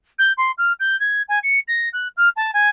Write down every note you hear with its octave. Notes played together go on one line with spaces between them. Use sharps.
G6
C6
F6
G6
G#6
G#5
C#7
A#6
F#6
F6
A5
G#5